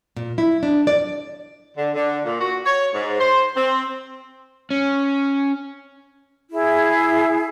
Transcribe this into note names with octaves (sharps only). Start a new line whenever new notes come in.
A#2
E4
D4
D5
D3
D3
A#2
F#4
C#5
G#2
C5
C4
C#4
E4 G#4